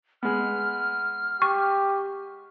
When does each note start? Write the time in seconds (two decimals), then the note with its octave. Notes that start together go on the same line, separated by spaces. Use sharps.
0.23 G#3 B3 F6
1.42 G4 C#6